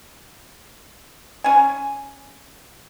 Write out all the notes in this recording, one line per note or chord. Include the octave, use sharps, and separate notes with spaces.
C#4 G#5